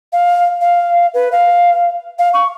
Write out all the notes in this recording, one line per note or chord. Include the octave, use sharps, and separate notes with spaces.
F5
F5
B4
F5
F5
C#6